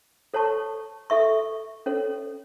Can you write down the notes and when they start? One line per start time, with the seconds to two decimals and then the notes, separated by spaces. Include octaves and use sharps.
0.34 A4 C#5 A5 C#6
1.10 A4 E5 C#6
1.86 C#4 A4 C#5